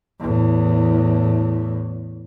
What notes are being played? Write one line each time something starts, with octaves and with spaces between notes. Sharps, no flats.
E2 A2